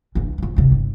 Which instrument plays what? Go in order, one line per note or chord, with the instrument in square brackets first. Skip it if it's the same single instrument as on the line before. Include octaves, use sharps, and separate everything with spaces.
[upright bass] E3 D4
F2 F3
E2 C3
G1